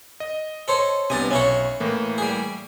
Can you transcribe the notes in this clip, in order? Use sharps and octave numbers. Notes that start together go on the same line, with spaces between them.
D#5
A4 C5 C#5
G2 C3 B3 D#5 G#5 A6
B1 C#4 E4 C#5 C#6
A2 E3 A#3
G3 G#4